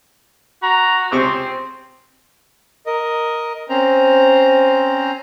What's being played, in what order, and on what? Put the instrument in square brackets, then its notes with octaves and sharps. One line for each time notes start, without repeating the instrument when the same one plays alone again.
[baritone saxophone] F#4 [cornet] A#5
[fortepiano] C#2 C3 C#6 [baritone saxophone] C4 [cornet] C5
[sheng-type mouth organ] A#4 D#5
C4 C#4 C5 A#5